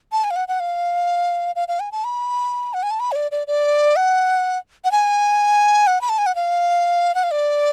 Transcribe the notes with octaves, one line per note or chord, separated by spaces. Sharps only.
A5
G#5
F5
F#5
F#5
F5
F5
F5
G#5
A5
B5
F#5
G#5
A5
B5
C#5
D5
D5
D5
F#5
F#5
G#5
F#5
B5
A5
G#5
F#5
F5
F#5
F5
D5